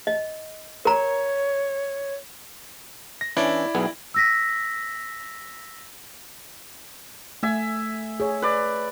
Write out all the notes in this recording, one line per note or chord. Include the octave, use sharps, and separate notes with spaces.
D#5
A#4 C#5 A#5
A#6
E3 C#4 D4 E4 D5
B1 B3 G#4
E6 A#6 B6
A3 E5 G#5
G#4 C#5
B4 D5